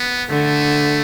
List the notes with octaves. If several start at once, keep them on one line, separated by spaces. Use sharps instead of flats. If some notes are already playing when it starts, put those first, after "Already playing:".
Already playing: B3
D3 A3